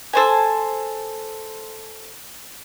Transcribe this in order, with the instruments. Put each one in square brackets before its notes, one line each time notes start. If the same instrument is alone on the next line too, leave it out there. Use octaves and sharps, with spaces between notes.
[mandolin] A4 C5 G#5